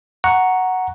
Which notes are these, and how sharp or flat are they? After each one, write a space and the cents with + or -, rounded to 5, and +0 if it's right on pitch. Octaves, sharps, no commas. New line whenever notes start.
F#5 +0 A#5 +0 C#6 +0